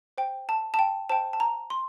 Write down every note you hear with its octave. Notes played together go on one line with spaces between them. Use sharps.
C5 G5
A5
A5
G5
C5 G5 A5
A5
A#5
C6